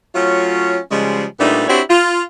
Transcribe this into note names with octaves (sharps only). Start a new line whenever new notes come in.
F#3 A3 C#4 F4
C#3 F3 G3 G#3
A#2 G3 A3 B3 D4 D#4
C4 D4 E4 F#4 G4 C#5
F4